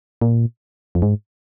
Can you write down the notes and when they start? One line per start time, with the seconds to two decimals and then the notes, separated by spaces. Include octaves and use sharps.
0.22 A#2
0.95 F2
1.02 G#2